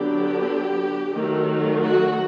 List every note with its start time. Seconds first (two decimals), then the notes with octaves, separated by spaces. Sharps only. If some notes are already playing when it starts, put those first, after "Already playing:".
Already playing: D3 F#3 B3 D4 G4
1.15 D#3 F#3 A3
1.85 F#4